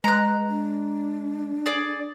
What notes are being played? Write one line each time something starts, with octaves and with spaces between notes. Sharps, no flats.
G#3 B4 A#5 F#6
D4
G#4 D5 D6